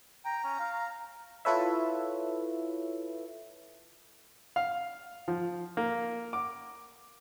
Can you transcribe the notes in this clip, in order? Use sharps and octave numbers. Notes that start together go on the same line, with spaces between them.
G5 A#5
C#4
F5
E4 F4 A4 B4 C#5 E5
F5
F3
A#3
D6